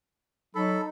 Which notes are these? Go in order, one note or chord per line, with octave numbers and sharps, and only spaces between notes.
F#3 D#4 A4 B5